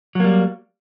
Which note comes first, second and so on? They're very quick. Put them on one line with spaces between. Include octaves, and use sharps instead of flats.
F#3 A#3 G3